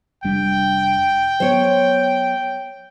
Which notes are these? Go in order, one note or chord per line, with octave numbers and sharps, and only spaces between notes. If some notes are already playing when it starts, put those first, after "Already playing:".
F1 G3 D4 G5
F#3 B3 C5 C#5